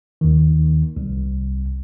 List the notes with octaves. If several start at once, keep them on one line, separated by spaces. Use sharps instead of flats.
D#2 D#3
C2